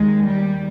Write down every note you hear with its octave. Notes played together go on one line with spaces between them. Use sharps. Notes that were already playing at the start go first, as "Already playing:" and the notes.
Already playing: D#2 D#3 G#3
G3